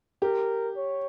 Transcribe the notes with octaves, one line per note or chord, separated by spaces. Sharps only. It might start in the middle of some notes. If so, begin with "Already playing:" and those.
G4 A#4
C#5